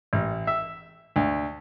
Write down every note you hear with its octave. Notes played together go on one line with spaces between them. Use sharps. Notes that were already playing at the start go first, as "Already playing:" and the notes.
A1
E5
D2